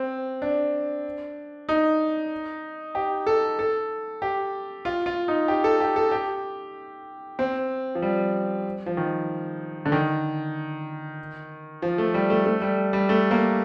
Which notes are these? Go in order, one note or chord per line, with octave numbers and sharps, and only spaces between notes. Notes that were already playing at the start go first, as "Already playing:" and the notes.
Already playing: C4
D4
D#4
G4
A4
A4
G4
F4
F4
D#4
G4
A4
G4
A4
G4
C4
F3
G3
F3
D#3
D3
D#3
F3
A3
G3
A3
A3
G3
G3
A3
A#3